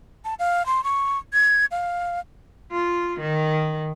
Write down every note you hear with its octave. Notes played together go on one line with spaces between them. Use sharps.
A5
F5
C6
C#6
G#6
F5
F4
D#3